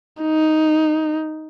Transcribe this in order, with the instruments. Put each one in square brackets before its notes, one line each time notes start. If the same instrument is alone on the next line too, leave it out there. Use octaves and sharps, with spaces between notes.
[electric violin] D#4